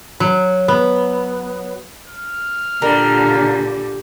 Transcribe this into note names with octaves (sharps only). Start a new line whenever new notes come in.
F#3
B3
F6
A#2 D3 G3 A#4